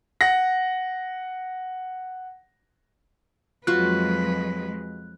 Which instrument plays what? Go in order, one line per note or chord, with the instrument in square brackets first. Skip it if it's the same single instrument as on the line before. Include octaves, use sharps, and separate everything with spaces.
[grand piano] F#5 A#6
[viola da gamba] F2 B4 [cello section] F#3 G#3 [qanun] F4 F#4 [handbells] F#6